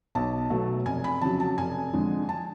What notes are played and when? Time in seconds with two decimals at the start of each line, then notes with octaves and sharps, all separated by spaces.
0.15 B1 A5
0.50 B2 F#3 A3
0.86 F1 G#5
1.04 B5
1.21 F2 C#3 F#3 A5
1.40 A5
1.58 F1 G#5
1.93 F2 D3 G#3
2.29 A5